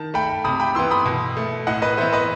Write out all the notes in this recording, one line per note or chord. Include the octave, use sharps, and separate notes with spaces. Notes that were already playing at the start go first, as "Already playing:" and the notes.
Already playing: D#3 A5
A3 G5 B5
C3 B5 D#6
G5 B5
E3 B3 C6 E6
B5 D#6
B2
A3
A2 D#5 F#5
B4 D#5
E3 B3 C5 E5
B4 D#5